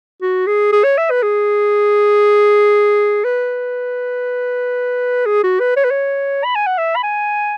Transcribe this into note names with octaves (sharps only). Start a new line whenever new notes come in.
F#4
G#4
G#4
C#5
E5
B4
G#4
B4
G#4
F#4
B4
C#5
B4
C#5
B5
G#5
F#5
E5
B5
G#5